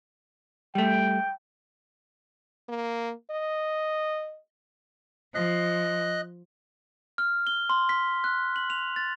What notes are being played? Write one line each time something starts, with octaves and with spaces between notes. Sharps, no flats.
G3 A3 G5
A#3
D#5
F3 D#5 F#6
F6
G7
C6
B6
F#6
F#7
F7
A6